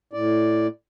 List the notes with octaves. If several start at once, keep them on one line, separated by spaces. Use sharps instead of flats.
A2 D5